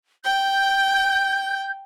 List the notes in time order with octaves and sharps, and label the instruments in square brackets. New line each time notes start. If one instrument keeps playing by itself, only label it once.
[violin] G5 [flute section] G6